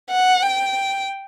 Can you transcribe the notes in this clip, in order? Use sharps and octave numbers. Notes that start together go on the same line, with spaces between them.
F#5
G5